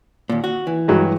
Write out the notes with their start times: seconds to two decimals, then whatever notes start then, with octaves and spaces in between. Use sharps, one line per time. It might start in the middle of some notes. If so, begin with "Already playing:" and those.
0.29 D#2 A#2
0.44 F#4
0.67 E3
0.88 G2 F#3 G#3